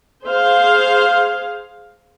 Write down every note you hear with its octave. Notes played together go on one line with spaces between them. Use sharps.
G#4 C5 F5